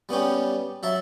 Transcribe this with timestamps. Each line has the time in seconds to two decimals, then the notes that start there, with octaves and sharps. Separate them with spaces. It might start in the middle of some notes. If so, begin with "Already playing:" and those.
0.09 G3 B3 C#4 G4
0.83 F#3 E5 A5